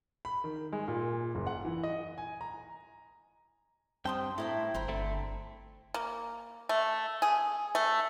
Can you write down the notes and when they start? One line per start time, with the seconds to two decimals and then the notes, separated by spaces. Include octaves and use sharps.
0.25 B5
0.44 D#3
0.72 G#3
0.88 A#2
1.35 F#1
1.47 F#5
1.65 E3
1.83 D#5
2.18 G#5
2.41 A#5
4.05 G2 C4 G5 A5 C6 D#6
4.38 A2 E4 A4 A#4 G5
4.74 G1 C5 A#5 B5
4.88 D3 A3 C4
5.94 A#3
6.69 A3
7.22 G#4
7.75 A3